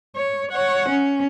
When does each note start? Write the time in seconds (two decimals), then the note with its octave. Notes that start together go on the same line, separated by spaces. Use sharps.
0.16 C#5
0.52 C#5 F#5
0.89 C#4